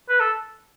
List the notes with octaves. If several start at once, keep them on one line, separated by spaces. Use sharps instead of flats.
B4
A4